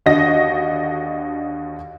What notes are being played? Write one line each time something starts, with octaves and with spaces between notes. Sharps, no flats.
D#2 D3 F#4 D#5 A#6